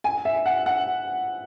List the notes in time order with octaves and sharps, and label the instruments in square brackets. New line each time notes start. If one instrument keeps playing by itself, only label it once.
[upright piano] G#5
E5
F#5
F#5